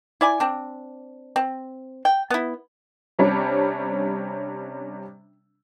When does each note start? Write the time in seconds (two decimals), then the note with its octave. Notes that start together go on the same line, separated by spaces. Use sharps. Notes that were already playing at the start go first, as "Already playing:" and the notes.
0.21 E4 D5 G#5
0.40 C4 D4
1.36 C4
2.05 G5
2.30 B3 E4
3.19 C3 G3 C#4 D4